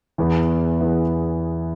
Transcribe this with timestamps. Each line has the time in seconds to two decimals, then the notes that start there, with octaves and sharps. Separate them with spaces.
0.18 E2 E3 B3 G#4
0.81 E3 B3 G#4